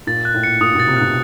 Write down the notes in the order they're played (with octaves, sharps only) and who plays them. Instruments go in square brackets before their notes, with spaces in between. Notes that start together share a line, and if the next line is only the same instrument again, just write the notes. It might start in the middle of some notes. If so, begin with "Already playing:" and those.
[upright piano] A#2 [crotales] A6
[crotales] F#6
[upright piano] A2
[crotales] C#7
[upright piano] A#2 [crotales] D#6
[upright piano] B2 [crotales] A6
[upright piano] C3
[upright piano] B2 [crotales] F#6